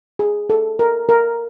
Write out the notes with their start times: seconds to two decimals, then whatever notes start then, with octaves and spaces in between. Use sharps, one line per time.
0.19 G#4
0.50 A4
0.79 A#4
1.09 A#4